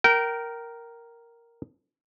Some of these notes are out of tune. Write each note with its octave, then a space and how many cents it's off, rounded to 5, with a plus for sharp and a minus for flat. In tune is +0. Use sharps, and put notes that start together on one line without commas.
A#4 +0 G5 -25